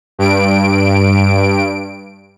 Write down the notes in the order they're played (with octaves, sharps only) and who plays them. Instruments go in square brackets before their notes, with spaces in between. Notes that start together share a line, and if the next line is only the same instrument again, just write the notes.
[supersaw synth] G2 D7